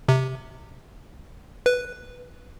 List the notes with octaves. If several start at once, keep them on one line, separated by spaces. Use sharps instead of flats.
C3
B4